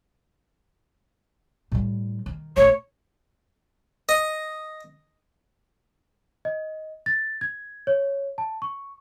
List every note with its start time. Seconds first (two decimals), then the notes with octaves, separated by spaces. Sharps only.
1.72 A2 G3
2.26 D#3
2.57 A#1 A3 C#5
4.09 D#5
6.45 D#5
7.06 A6
7.41 G#6
7.87 C#5
8.38 A5
8.62 C#6